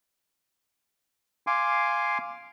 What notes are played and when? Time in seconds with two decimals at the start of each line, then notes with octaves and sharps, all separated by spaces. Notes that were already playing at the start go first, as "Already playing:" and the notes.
1.47 F5 G#5 C6 D6